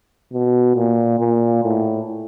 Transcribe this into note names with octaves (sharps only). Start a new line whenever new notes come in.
B2
A#2
A#2
A2